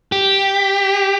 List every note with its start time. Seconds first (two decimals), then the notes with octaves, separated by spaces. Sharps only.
0.12 G4